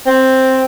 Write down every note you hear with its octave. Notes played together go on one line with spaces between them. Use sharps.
C4